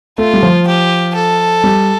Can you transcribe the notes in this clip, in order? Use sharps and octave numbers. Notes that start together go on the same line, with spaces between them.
A3 F4
G3
F3
G4
A4
G3